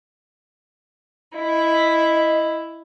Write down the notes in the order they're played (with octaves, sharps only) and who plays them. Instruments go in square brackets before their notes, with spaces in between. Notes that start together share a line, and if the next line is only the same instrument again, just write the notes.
[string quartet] E4 [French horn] D#5